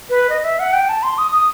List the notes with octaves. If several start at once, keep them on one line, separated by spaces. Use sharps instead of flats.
B4
D#5
E5
F#5
G5
A5
C6
D#6
D#6